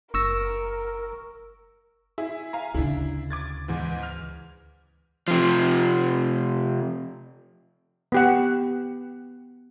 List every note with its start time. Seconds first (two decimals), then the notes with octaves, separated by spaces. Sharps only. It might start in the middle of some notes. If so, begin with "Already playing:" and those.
0.14 F#1 A#4 C#6 E6 A#6
2.18 E4 G#4 E5
2.53 F5 G#5 A#5
2.74 D2 C#3 D4 E4
3.30 D6 G#6 A6
3.68 E2 G#2 E3
4.03 F6 F7
5.28 C3 F3
8.12 B3 G4 F#5